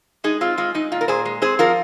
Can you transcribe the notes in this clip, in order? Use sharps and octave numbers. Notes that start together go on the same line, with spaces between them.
G#3 D#4 G#4
C4 F4
G#3 F4
G#3 D#4
A#2 F4
A#4
A#2 G#4 C5
G#3
C4 G#4 C5
F3 F4 A#4